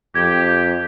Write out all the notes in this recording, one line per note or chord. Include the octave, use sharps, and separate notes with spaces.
F2 G4 G#6